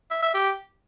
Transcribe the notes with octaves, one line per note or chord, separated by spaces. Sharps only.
E5
E5
G4